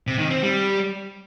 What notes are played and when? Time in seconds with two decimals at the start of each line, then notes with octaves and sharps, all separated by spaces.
0.07 C3
0.19 D#3
0.31 C4
0.42 G3